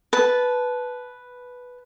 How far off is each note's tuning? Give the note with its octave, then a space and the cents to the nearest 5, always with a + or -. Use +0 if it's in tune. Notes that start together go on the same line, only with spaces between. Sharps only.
B4 +0 A5 -15